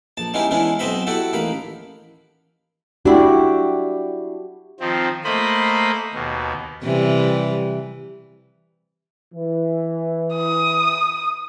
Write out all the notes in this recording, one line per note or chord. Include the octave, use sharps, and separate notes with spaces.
A#1 A5
G#3 B3 C#4 D#4 E4 G4
E3 G#3 B3 C#4 D4 E4
B1 B3 C4 D#5 E5 B5
E4 F#4 G4 A4 F#5
A1 D#2 A#3 B5
D4 E4 F#4 G4
D#3 F3 C4
A3 A#3 C5 D#5 B5
D#2 B2
C3 E3 G3
E3
D#6